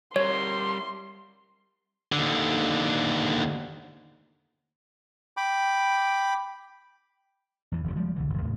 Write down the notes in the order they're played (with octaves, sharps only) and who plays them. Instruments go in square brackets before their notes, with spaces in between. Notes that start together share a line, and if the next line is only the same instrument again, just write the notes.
[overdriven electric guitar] G3 A#4 [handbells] C#5 [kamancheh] C6
[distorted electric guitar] D#2 D3
[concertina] G5 B5 D6
[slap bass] E2 E3
F#1 E2 A#2 C#3
F3 G3 G#3
C2 D3 E3
E1 C#2
D#2 A2 C#3